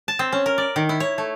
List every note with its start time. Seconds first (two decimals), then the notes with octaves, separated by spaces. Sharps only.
0.08 A5
0.19 C4
0.32 C#4
0.46 A#4
0.58 D5
0.76 D#3
0.89 E4
1.00 C#5
1.18 A3